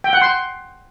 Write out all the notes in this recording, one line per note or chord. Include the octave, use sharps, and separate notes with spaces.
G5
F#5
C6